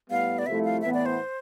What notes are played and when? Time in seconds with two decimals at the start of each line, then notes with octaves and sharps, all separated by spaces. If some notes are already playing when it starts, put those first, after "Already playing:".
0.09 A2 G3 B3 F5
0.38 D5
0.46 C2 C3 F3 A3 E4 E5
0.64 F5
0.81 A2 E3 B3 E5
0.94 D5
1.06 C5